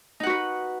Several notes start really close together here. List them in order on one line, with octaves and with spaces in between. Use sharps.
D#4 F#5 F#4 B4